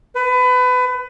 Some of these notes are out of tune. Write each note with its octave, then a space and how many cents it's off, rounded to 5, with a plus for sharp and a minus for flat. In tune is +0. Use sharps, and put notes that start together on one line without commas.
B4 +25